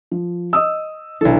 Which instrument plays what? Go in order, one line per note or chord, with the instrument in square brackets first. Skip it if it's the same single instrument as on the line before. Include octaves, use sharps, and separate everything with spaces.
[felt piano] F3
D#5 D#6 E6
[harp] B1 A4 [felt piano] E3 D4